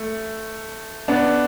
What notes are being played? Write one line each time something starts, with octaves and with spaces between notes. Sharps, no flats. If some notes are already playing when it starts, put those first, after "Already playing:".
Already playing: A3
B3 D4